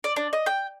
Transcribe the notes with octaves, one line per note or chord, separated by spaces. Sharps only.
D5
D4
D#5
G5